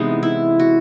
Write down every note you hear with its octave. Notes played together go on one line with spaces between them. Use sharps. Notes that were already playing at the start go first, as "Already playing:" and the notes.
Already playing: C3 E3 G#3 B3 D#4
E4
F#4